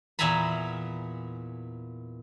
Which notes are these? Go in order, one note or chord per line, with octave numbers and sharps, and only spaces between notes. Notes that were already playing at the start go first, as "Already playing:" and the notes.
E2 A#2 E5 G#5 A#5 B5